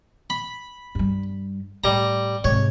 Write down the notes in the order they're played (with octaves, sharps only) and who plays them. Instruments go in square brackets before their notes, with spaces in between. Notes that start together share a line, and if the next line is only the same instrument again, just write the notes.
[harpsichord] B5
[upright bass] G2 G3
[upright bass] A2 [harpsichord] G3 A#5
[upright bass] G#2 C3 [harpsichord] C#5